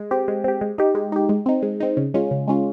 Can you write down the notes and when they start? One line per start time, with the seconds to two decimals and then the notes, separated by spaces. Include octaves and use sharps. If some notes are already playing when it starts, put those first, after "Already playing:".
Already playing: G#3
0.11 C4 G4
0.28 G#3
0.44 C4 G4
0.61 G#3
0.78 D#4 G4
0.95 G#3
1.12 D#4 G4
1.29 G#3
1.46 C4 D#4
1.63 G#3
1.80 C4 D#4
1.97 C#3
2.14 G#3 C#4 F4
2.31 C#3
2.48 G#3 C#4 F4